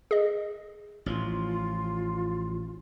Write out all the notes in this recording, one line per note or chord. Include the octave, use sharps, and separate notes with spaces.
G#4 D#5
A1 F3 F4